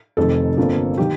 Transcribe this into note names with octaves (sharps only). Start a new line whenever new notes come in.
F1 F2 D#3 A4
G1 F2 D3 F3 A#3
D#3 G4